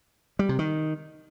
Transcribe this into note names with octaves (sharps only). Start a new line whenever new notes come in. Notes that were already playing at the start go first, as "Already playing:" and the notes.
G3
C3
D#3